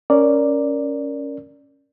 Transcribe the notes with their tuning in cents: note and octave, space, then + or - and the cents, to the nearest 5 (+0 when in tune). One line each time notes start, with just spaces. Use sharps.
C#4 +0 A#4 +0 D5 +0